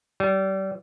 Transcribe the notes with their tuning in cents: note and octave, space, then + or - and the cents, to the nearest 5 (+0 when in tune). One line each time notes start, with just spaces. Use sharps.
G3 -30